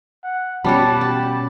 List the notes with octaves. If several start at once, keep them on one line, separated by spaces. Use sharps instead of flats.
F#5
B2 G3 C#4 F#4 A5 B5 D6 F#6
G4 A5